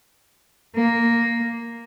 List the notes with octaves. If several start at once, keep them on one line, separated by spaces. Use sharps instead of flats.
A#3